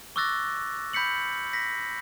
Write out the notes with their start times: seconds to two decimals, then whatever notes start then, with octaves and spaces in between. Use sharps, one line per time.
0.16 C#6 D6 E6 F#6 A6 A#6
0.93 B5 G6 B6 C#7 F#7
1.53 A#6 B6